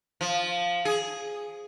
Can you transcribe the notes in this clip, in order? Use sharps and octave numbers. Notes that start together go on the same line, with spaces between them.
F3
G#4